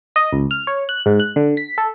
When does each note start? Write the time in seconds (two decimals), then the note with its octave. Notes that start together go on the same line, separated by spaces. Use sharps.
0.16 D#5
0.33 C#2
0.51 F6
0.67 C#5
0.89 F#6
1.06 G#2
1.20 F#6
1.36 D3
1.57 B6
1.78 A4